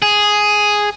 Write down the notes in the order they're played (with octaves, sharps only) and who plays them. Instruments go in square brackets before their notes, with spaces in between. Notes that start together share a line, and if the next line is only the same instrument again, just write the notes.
[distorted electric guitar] G#4